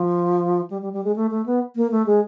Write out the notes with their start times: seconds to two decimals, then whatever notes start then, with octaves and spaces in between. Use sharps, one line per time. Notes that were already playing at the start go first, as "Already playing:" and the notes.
Already playing: F3
0.70 G3
0.82 G3
0.93 G3
1.04 G#3
1.16 A3
1.31 A3
1.46 B3
1.76 A#3
1.91 A3
2.07 G#3